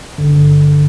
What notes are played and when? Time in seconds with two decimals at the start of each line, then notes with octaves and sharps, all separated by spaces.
0.18 G#1 G2 D3